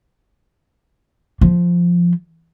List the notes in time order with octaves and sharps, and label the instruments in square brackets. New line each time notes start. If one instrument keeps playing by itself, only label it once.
[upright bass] F3